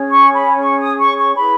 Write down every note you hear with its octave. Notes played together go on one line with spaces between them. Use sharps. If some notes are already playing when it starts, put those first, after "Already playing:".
Already playing: C#4 G#4 C#5
C#6
B5
C#6
D#6
C#6
C#6
E4 G#4 B4 B5